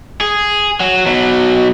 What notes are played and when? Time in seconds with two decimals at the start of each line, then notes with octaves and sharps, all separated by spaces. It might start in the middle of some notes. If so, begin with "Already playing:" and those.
0.21 G#4
0.80 F#3
1.06 B2 F#3